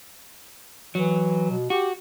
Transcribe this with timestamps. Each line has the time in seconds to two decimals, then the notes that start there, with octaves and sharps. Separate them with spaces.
0.95 E3 F#3
1.50 B2
1.70 F#4 G4